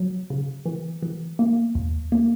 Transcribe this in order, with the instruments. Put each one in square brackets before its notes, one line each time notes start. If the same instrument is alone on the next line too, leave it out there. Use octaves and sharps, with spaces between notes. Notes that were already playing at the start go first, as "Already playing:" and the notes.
Already playing: [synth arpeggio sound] F#3
C#3
E3
E3
A#3
D#2
A#3